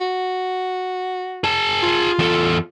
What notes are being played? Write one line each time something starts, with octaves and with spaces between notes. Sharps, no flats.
F#4
G#4 A5
F4
E2 A4